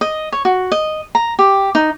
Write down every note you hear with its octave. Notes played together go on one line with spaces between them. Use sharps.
D#5
C#5
F#4
D#5
A#5
G4
D#4